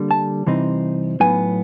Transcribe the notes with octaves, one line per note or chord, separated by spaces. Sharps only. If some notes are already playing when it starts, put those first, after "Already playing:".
Already playing: D3 G3 A#3 D4
A5
C3 E3 G3 C4 D#4
A2 F#3 B3 D#4 G#5